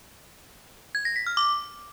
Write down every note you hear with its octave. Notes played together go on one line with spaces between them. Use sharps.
G#6
A#6
B6
F6
D6